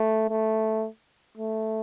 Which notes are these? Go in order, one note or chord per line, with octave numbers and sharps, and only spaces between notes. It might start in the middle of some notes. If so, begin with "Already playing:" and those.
Already playing: A3
A3
A3